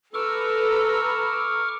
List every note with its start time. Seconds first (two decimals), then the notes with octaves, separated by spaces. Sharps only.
0.14 A4 B4 A#5 C#6 D6 E6 F6